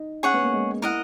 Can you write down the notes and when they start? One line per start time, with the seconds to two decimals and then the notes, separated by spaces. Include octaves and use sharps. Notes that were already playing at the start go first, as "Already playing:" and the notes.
Already playing: D#4
0.23 C#4 G#4 C#5 F#5
0.33 B3
0.43 A#3
0.53 G#3
0.82 E4 A#4 D#5 F#5